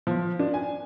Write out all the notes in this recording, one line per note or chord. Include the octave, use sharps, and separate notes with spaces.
F3
D4
G#5